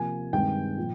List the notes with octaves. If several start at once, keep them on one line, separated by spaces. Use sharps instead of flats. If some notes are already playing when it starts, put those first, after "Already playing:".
Already playing: C3 F3 A#3 G#5
G2 D#3 G#3 C4 G5
A#2 F3